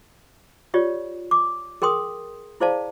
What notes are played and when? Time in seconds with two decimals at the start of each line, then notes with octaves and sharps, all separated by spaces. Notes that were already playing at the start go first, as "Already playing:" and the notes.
0.74 F4 G4 C#5 D5
1.31 D6
1.82 G#4 A#4 G5 C6 D#6
2.60 E4 G#4 C5 D5 F5 A5